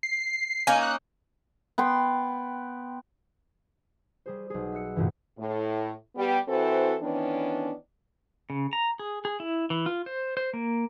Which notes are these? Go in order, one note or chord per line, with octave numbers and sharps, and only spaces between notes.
C7
A#3 C#4 D#4 G#5
F#6
B3 G5 C6
G3 G#4 C5
B1 G#4
E5 E6 F#6 C#7
F#1 D2 G2 A#2 E3
A2
G3 B3 G4
E3 C4 E4 F#4 A4 C5
D#3 E3 B3 C#4 D4
C#3
A#5
G#4
G#4
E4
E3
F4
C5
C5
A#3